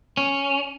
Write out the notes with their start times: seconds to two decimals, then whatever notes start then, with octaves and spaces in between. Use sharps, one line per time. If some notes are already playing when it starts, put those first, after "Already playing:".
0.17 C#4